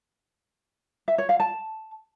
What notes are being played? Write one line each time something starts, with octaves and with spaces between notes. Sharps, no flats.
E5
C#5
F5
A5